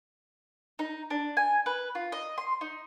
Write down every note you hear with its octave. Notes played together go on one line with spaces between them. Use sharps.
D#4
D4
G#5
B4
F4
D#5
C6
D#4